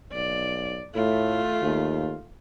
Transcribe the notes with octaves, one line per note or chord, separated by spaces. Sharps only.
B1 D5
A2 A3 F4
D#2